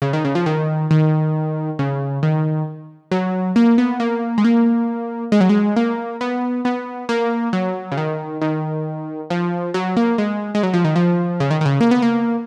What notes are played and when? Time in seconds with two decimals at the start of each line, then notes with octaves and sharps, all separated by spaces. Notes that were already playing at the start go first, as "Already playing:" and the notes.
0.02 C#3
0.13 D#3
0.25 C#3
0.35 F3
0.46 D#3
0.91 D#3
1.79 C#3
2.23 D#3
3.11 F#3
3.56 A#3
3.78 B3
4.00 A#3
4.38 G#3
4.45 A#3
5.32 G#3
5.41 F#3
5.49 G#3
5.76 A#3
6.21 B3
6.65 B3
7.09 A#3
7.53 F#3
7.92 C#3
7.97 D#3
8.41 D#3
9.30 F3
9.74 F#3
9.97 A#3
10.18 G#3
10.55 G#3
10.63 F#3
10.74 F3
10.85 D#3
10.96 F3
11.40 C#3
11.51 D#3
11.61 D#3
11.66 C#3
11.81 A#3
11.91 B3
12.02 A#3